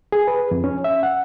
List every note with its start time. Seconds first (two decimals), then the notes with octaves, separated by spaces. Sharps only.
0.12 G#4
0.28 B4
0.51 F2
0.64 C#4
0.84 E5
1.03 F#5